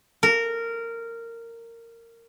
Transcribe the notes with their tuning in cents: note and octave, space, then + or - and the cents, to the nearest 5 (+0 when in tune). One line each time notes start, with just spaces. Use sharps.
A#4 -15